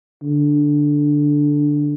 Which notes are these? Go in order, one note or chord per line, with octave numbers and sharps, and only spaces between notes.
D3